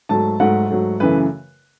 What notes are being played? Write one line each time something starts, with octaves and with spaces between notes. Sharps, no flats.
G#2 F#3 A3 A5
G#2 F#3 A3 F#5
G#2 F#3 A3
F#2 C#3 E3 A3 B4